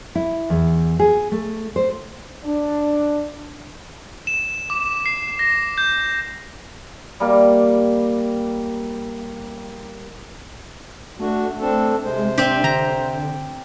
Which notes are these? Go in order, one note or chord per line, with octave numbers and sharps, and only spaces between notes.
E4
E2
G#4
A3
C5
D4
E7
D6
C7
A#6
G6
G3 A#3 G4
A3 D4 F#4
C4 D4 A4
C3 G#3 C5
C4 D4 G4
D3 A#5